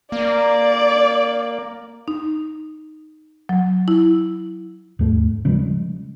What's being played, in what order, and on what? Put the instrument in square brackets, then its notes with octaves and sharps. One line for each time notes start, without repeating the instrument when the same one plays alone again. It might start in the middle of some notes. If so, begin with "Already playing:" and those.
[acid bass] A#3 [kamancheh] D5
[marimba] D#4
F#3
E4
[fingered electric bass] D#2 G#2 A3
C#3 F3 G3 G#3